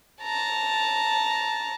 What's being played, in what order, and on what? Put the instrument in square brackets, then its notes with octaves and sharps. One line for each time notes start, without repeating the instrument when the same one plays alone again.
[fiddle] A5 A#5